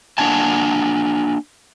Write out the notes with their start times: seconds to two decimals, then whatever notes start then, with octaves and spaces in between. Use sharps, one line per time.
0.18 A#3 D4 F#5 G#5 A5